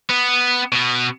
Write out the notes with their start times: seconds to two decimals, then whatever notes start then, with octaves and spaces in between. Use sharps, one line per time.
0.09 B3
0.72 B2 B3